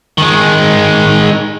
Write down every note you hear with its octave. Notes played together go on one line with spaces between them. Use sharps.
D#3 G#3